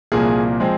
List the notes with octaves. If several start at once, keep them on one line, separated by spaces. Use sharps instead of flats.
C2 A#2 F3 A#3 G#4
F3 G#3 C4